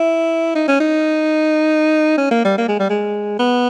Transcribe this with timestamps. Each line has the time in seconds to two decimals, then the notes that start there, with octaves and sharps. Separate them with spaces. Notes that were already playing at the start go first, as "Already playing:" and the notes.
Already playing: E4
0.55 D#4
0.68 C#4
0.80 D#4
2.18 C#4
2.31 A#3
2.44 G3
2.58 A#3
2.68 G#3
2.79 G3
2.90 G#3
3.39 B3